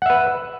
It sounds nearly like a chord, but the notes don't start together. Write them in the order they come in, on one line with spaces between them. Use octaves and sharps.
F#5 E5 B4